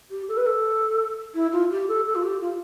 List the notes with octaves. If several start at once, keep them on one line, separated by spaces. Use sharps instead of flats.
G4
A4
B4
A4
E4
F4
G4
A4
A4
F4
G4
F4